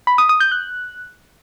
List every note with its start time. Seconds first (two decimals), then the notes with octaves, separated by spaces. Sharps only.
0.07 B5
0.18 D#6
0.29 D#6
0.40 G6
0.52 F#6